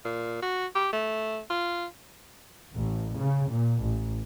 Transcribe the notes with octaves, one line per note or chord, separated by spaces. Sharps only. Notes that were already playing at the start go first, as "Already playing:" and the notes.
A#2
F#4
G4
A3
F4
A1
C#3
A#2
A1